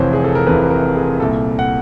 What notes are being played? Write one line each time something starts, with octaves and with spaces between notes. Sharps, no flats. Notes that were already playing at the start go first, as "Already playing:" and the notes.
Already playing: F1 F2 C3 E3 C5 C#5
G#4
A4
A#4
F1 F2 C3 E3 B4
A#4
G#4
C2 A#2 A4
F#5